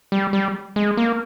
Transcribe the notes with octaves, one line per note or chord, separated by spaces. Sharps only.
G3
G3
G#3
A#3